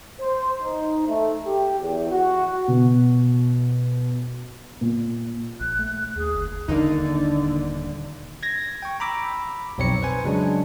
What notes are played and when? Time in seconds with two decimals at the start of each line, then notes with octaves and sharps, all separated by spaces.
0.20 C5
0.63 D#4
1.07 A3
1.45 G4
1.81 E2
2.11 F#4
2.68 B2
4.81 A#2
5.60 A#1 F#6
5.79 A3
6.16 D#2 G#4
6.35 G1
6.68 D#1 D3 D#3 A#3 D4 D#4
8.43 G#6 A#6
8.82 G5 C#6
9.00 A#5 B5 D6 E6
9.78 B1 F2 C4 C#5 A#5 C#7
10.02 B4 C5 G#5
10.24 C#3 F#3 G#3 D4